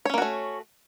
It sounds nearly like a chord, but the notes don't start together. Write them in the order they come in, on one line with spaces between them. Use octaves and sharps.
C#5 C#4 A#3 F#4 A3